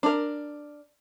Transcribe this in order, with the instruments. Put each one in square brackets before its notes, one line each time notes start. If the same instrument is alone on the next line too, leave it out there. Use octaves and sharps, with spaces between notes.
[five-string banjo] D4 A#4